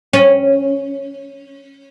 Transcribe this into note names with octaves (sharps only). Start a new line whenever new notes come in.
C#4